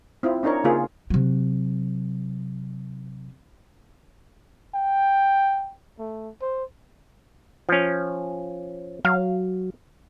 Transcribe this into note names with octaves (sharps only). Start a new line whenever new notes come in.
C4 E4 F4
C4 D4 D#4 A#4 C#5
C#3 A#3 F4 G#4
C3 F#3
G5
A3
C5
F3 C#4
F#3 F5